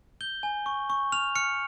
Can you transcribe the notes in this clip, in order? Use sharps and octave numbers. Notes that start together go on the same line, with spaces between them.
G6 G7
G#5
C#6
C#6
F6 F7
F6 C#7